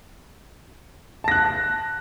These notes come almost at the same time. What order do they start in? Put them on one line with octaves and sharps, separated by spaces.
A5 A#6 F#6